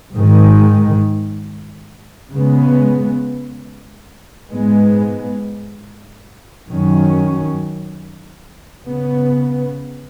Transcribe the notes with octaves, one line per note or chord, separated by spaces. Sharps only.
G#2 D#3 G#3
C#3 G#3 B3
G#2 G#3 B3
F#2 D#3 F#3 C#4
C#3 B3